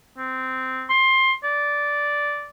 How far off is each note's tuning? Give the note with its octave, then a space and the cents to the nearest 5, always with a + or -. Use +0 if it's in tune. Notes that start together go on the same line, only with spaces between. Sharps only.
C4 -10
C6 +20
D5 -10